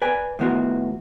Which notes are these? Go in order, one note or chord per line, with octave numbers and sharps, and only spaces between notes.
B4 D5 G#5
A2 D#3 B3 F4 F#4